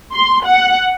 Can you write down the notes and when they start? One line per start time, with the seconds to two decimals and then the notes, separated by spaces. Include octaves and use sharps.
0.14 C6
0.46 F#5